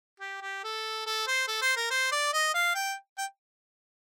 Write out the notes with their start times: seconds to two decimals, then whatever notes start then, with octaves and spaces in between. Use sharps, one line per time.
0.20 G4
0.41 G4
0.64 A4
1.06 A4
1.27 C5
1.48 A4
1.62 C5
1.76 A#4
1.91 C5
2.12 D5
2.34 D#5
2.54 F5
2.75 G5
3.18 G5